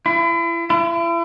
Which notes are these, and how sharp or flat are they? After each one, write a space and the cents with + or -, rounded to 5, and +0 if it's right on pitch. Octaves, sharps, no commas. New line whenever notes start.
E4 +35
E4 +40